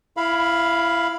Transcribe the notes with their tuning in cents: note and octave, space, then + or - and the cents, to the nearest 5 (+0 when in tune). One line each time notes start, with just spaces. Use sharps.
E4 +25 F5 +0 B5 +0